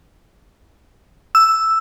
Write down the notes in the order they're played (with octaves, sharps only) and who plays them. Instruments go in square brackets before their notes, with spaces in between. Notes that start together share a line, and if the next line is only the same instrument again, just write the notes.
[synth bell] E6